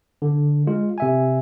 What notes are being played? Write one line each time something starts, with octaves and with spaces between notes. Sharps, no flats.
D3
G#3 F4
C3 E5 G#5